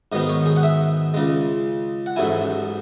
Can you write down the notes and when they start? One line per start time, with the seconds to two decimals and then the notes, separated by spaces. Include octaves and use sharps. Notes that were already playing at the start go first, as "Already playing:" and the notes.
0.12 G#2 D#3 F#3 B3 D#5
0.29 C#5
0.46 G#4
0.56 F#5
0.63 E5
1.14 C#2 C#3 G#3
2.06 F#5
2.16 A1 G#2 F#3 A3 E4 G#5